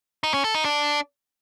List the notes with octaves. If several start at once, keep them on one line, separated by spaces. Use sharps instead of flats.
D#4
C#4
A4
D#4
D4